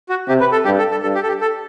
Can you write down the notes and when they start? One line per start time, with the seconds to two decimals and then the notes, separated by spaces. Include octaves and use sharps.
0.09 F#4
0.28 C3 G4
0.40 B4
0.52 A4
0.65 G2 G4
0.78 A4
0.91 A4
1.02 G2 A4
1.15 G4
1.23 A4
1.28 G4
1.41 A4